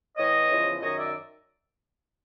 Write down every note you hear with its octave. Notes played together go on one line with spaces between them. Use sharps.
A2 E3 C#5 D#5
E2 C#3 F3
F#2 D#3 C#5 D#5
D5 E5